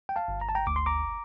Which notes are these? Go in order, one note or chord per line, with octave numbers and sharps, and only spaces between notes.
G5
F5 A5
G1
A#5
A5
G5 A#5
D2 D6
C6
A#5 D6